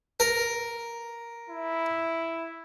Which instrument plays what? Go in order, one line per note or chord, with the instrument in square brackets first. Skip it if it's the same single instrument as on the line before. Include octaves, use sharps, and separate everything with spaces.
[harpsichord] A#4
[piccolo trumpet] E4